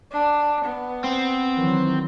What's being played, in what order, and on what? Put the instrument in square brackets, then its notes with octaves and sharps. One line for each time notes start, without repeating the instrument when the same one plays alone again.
[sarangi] D4
B3
[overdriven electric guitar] C4
[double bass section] D#3 E3 F#3